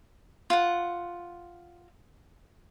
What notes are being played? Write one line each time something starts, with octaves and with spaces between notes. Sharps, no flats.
F4 F#5